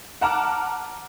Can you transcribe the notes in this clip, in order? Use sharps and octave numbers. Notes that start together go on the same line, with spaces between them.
F#5 A5 A#5 D6 F6